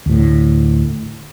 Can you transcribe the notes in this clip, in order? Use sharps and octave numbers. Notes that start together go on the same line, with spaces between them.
D2 A2